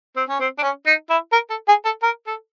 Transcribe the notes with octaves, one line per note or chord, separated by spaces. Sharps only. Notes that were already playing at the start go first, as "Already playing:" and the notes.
C4
C#4
C4
D4
C#4
D#4
E4
A#4
A4
G#4
A4
A#4
A4